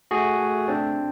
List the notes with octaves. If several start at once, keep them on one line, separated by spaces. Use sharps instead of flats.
A3 F#4 G#4
A3
C4 D4